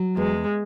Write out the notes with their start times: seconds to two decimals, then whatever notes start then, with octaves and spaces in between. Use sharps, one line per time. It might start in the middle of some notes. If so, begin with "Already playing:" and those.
Already playing: F#3
0.17 E2 G#3